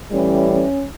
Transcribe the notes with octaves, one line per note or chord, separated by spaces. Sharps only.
A2 E3 G3 C#4
C#4